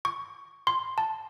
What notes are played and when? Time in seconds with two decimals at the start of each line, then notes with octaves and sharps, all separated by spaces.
0.05 C#6
0.67 C6
0.98 A5